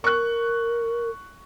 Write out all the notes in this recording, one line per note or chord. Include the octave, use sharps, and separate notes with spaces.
A#4 C#6 F#6